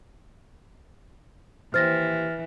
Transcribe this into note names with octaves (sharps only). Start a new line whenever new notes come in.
D#2 E3 C5 F6 A6 A#6